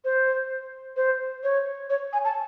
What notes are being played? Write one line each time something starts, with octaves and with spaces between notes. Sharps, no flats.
C5
C5
C#5
C#5
G#5
A5